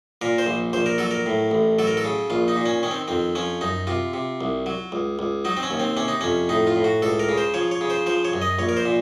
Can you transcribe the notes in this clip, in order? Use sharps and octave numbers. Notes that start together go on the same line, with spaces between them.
A#2 A#4
C5
A#1
A#1 C5
A#4
F#3 A4
A#4
A2
A1
F#3 A4
A#4
A4
C#3
A#1 F4
D#4
A#2
C#4
D#3 C#4
C4
F2 C4
F3 C#4
F#2 D#4
C3 F4
C3
C2
F#3
C#2
C#2
F#3 D#4
C4
C#4
D#2
C4
C3 C#4
D#4
F2 C#4
A2 D#4
F4
A2
F#4
C#2 A4
A#4
C#3
C5
F3 C#5
C#5
C#3
C5
F3 C5
C#5
F#2
D#5
A#1 C#5
A#4
C5
A#2